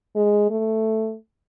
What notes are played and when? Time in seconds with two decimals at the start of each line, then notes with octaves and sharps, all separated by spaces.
0.16 G#3
0.50 A3